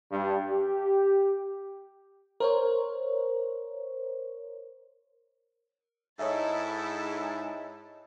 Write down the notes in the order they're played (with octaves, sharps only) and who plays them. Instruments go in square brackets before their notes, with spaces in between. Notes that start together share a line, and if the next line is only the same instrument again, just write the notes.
[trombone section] G2
G4
[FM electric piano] A#4 C5 C#5
[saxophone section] G#2 A4 [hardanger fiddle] E4 A5 [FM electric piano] C#5 D#5 E5